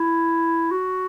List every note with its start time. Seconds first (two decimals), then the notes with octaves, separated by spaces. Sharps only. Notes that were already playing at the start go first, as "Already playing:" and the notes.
Already playing: E4
0.71 F#4